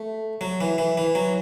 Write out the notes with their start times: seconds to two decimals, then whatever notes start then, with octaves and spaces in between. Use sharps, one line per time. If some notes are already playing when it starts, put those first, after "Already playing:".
Already playing: A3
0.41 F#3
0.61 E3
0.78 E3
0.98 E3
1.15 F#3